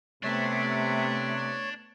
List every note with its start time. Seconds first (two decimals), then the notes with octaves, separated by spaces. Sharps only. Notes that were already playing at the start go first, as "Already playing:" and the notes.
0.23 C3 A3 B3 D4 C#5